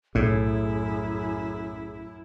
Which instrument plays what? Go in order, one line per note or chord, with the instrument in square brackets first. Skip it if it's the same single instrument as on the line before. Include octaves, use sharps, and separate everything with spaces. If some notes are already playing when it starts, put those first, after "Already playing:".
[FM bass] B1 [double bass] F#2 E4 [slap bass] A2 [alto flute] G#4